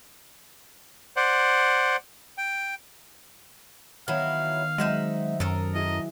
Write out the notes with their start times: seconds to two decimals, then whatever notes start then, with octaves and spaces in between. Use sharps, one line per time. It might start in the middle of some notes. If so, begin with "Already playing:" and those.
1.17 C5 D5 F#5
2.38 G5
4.08 D#3 F#3 B3 E4 F5
4.78 F#3 G#3 C4 D#4 E5 F#5
5.40 F#2 A4 A#4 D#6 C7
5.74 E4 F#4 G#4 D#5